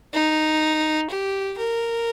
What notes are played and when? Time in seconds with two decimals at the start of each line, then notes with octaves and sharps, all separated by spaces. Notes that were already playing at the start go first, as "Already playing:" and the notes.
0.14 D#4
1.10 G4
1.58 A#4